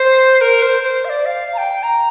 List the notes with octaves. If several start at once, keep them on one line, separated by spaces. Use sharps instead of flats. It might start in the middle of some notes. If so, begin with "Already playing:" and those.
Already playing: C5
A#4
C5
C5
F5
D5
F5
A#5
G5
A#5